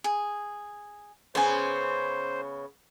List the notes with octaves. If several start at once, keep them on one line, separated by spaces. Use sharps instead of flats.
G#4
C#3 B3 C5 G#5 C6